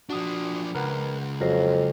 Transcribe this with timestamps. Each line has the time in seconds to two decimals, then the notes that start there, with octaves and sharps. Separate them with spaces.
0.10 F3 D4 F#4 D#6
0.75 C#2 A#4 B4 F#5
1.41 F2 F#3 F5 A#6